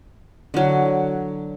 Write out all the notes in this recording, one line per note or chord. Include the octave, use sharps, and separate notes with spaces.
D3 F#3